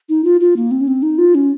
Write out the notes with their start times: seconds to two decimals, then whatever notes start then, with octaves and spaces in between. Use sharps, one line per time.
0.09 D#4
0.24 F4
0.41 F4
0.56 A#3
0.71 C4
0.81 C#4
0.88 C4
1.02 D#4
1.18 F4
1.35 C#4